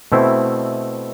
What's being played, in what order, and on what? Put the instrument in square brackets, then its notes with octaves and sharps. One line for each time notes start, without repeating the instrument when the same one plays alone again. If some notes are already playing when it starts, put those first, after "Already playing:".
[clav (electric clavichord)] B2 A3 C4 E4